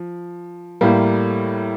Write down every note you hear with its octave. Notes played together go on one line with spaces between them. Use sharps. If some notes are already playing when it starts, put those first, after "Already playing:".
Already playing: F3
A2 G3 A#3